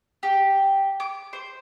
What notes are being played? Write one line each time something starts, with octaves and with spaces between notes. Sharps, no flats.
G4
D6
C5